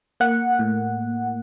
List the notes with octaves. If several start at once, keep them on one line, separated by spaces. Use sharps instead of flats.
A#3 F#5
A2